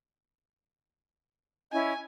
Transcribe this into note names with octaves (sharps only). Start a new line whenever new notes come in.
C#4 E4 D#5 G#5